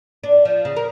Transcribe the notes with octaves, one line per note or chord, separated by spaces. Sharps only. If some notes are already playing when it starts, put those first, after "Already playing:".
D4
F3
C#3
A#4